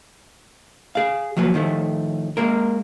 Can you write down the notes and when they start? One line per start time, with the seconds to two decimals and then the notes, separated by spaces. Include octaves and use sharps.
0.95 G#4 F5
1.37 F3 F#3 A#3 B4
1.54 A2 D#3 F3 A3
2.37 G#3 A#3 A#4